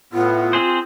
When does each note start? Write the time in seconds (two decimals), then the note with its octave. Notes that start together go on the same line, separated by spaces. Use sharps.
0.13 A2 B3 F4
0.53 C4 G#4 C5